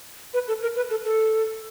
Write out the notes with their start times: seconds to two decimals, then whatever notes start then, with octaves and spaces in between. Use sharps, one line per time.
0.34 B4
0.48 A4
0.62 A#4
0.76 B4
0.90 A4
1.05 A4